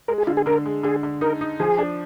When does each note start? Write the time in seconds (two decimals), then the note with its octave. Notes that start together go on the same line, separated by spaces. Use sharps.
0.08 G#3 A#4
0.18 G#4
0.27 D3 F4
0.37 G#4
0.46 D3 A#4
0.66 G#3
0.83 D3 G#4
1.03 D3
1.21 D#4 A#4
1.41 D#4
1.60 F3 G#4
1.78 D4